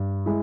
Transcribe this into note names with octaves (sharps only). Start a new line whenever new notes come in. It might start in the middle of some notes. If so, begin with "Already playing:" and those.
Already playing: G2
G#3 E4